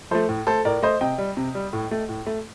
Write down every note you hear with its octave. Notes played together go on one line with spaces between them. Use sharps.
F3 A3 A4 C5
A2
A3 A4 C5
A2 A#4 D5
A3 C5 D#5
C3 D#5 G5
G3
C3
G3
A2
A3
A2
A3